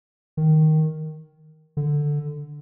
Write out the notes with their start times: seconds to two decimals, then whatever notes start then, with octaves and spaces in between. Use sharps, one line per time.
0.37 D#3
1.77 D3